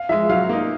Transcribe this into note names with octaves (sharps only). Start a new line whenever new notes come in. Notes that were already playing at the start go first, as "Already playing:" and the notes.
Already playing: F5
F3 G#3 E5
F#3 F5
A#3 D#4